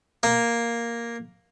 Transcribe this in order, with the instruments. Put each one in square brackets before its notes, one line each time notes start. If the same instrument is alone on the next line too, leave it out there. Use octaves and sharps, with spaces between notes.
[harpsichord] A#3